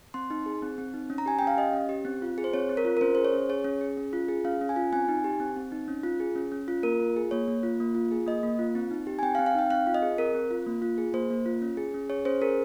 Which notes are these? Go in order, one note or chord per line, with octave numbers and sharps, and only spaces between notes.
C4 C6
D#4
G#4
C4
C4
D#4
C#4
A#5
G4 G#5
C#4 G5
F5
G4 D#5
C#4
G4
C4
F4
G#4
C5
C4 C#5
C4
A#4
F4
A#4
C#4 C5
G#4 C5
C#5
C#4
G#4 C#5
C#4
G#4
C#4
F4
G#4
C#4 F5
C#4
G#5
F4
C4 G#5
D#4
G4
C4
C4
D#4
C#4
F4
G#4
C#4
C#4
F4
A#3 A#4
F4
G#4
A#3 C#5
A#3
F4
A#3
F4
G#4
A#3 D#5
A#3
F4
C4
D#4
G4
G#5
C4 G5
F5
C4
F5
D#4 G5
C4 F5
F4
D#5
G#4
C4 A#4
C4
F4
A#3
F4
G#4
A#3 C5
A#3
F4
C#4
G#4
C#4
G#4 C#5
C#4 C5
G#4 A#4